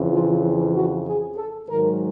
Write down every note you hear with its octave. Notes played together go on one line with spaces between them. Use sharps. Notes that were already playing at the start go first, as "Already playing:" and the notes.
Already playing: F2 C#3 E3
F4
F#4
G#4
A4
G#2 D#3 F#3 A#4